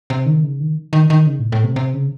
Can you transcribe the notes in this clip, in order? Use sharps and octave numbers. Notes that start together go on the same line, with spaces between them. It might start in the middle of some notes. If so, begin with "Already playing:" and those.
C3
D#3
C#3
D#3
D#3
D#3
C#3
A2
A2
C3
C3
C#3